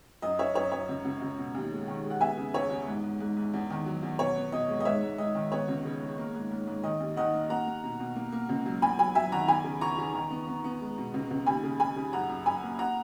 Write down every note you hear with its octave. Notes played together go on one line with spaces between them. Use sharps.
F#2 D#5
F#2 C#5 E5
F#2 C#5
F#2 C#5
C#2
C#2
C#2
B2
D#2
G#3
D#3
G#3
F#5
B3 E5 G#5
C#3
E2 C#5
E2
G#2
G#2
G#2
G#2
E2
D#3
F#3
E2
B2 C#5
B3
B2 D#5
G#3
D#5
G#2 C#5 E5
G#2
G#2 D#5
D#3
B3 C#5
C#2
C#3
G#3
A#3
G#2
G#2
G#2
D#3 D#5
D#2
D#3 D#5 F#5
A#3
A#3 F#5 A#5
A#3
B2
B2
A#3
A#3
C#2
F#3
E2 G#5 B5
F#3 G#5 B5
F#3 E5 G#5
D#3 F#5 A#5
E2 G#5 B5
C#3
E2 A#5 C#6
E2
D#3
B3
B3
B3
G#3
B2
C#2
C#2
D#2 G#5 B5
C#3
C#3 G#5 B5
C#3
F#2 F#5 A#5
F#2
F#2 G#5 B5
A#3
F#5 A#5